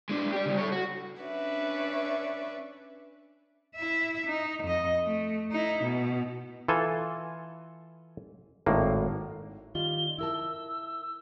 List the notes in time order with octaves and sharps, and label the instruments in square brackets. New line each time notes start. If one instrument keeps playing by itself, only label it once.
[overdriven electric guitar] G#3 D4
G4 D5
C#3 G3
A4 C#5
F#4
[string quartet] C#4 D4 B4 D5 E5
[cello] E4 E5
D#4
F2 D#5
A3
D#4 E4
B2
[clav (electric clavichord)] E3 F4 A4 G#5
G#1 A2 A#3
[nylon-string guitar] D#3 G3 F4 [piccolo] G7
[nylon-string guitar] E4 A#4 A5 [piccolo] E6